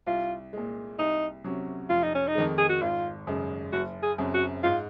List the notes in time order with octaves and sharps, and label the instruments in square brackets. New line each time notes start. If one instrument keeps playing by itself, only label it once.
[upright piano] C2 [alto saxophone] F4
[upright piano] A#2 G#3
[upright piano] C2 [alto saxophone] D#4
[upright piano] C3 F#3 C#4
[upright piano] F1 [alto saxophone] F4
[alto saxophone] D#4
C#4
D#4
[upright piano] F2 D#3 G#3
[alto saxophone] G#4
F#4
[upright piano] G#1 [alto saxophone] F4
[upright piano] F#2 C#3 G#3
[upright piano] F#1 [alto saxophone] F#4
[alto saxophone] G#4
[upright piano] F#2 C#3 F#3 C4
[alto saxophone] F#4
[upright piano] G#2 [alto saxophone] F4